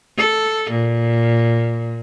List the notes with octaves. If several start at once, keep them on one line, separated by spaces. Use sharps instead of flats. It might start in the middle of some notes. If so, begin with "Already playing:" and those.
A4
A#2